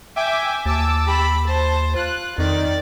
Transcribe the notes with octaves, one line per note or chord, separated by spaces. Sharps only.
E5 G5 G#5 D6
D#2 A5 D6 E6
G4 B5
C5 A5
F4 F#6
F2 D#3 D5